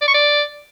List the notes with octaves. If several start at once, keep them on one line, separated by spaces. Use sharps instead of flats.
D5
C#6
D5